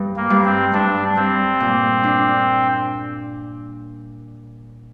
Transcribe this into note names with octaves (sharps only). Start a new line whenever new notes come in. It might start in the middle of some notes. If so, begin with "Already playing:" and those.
Already playing: G2
A#3
G2
C4
G2 D4
G2 C4
A#2
D4